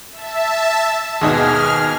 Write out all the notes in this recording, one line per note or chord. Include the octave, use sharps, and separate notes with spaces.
E5 A5
D#2 G#2 B2 G#4 F6